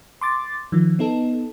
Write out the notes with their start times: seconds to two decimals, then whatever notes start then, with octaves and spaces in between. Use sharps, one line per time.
0.21 C6 D6 A6
0.72 D#3 F3
0.99 B3 D#4 A4